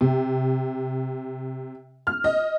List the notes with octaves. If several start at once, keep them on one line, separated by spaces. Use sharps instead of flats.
C3
F6
D#5